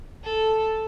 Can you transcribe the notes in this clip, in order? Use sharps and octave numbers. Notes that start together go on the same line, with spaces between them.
A4